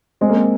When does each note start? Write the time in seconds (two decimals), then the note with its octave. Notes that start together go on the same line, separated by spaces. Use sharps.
0.21 G#3 C4
0.29 A#3
0.36 C4